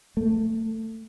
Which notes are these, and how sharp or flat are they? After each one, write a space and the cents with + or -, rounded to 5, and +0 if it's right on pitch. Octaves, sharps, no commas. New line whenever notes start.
A3 +20